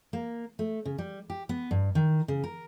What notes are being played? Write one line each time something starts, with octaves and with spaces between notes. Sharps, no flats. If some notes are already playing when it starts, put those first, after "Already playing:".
A#3
A3
C#3
G3
G4
B3
G2
D#3
C#3
A#4